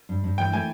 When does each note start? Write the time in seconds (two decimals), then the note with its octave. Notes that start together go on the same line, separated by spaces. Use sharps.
0.09 G2
0.24 G2
0.38 E3 G5
0.52 A3 G#5